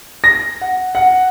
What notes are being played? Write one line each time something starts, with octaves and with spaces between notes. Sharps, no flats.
A#6
F#5
F#5